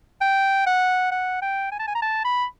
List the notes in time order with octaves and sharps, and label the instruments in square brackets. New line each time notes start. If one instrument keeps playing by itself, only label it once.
[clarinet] G5
F#5
F#5
G5
G#5
A5
G#5
A#5
A5
B5